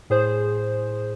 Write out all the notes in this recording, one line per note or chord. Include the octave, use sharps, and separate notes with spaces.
A2 G#4 C5